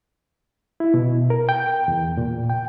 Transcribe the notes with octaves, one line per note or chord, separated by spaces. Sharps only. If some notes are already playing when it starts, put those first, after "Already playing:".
E4
B2
A#4
G5
E2
A#2
G5